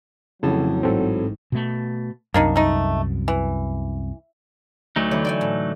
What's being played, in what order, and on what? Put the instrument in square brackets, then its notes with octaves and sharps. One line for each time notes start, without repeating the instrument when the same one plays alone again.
[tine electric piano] F2 A5 [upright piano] A2 E3 [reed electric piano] C#3 [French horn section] F#3
[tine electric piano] A1 G#2 [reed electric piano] C4 A4
[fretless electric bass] B2 A3
[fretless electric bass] C2 F#2 [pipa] A#3 D4 D#4
[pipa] A3 D#4
E3
[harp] D2 [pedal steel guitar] F#3 A3 D#4
[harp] D3 E3 [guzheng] C#5
[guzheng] D5 G5 G#5
A2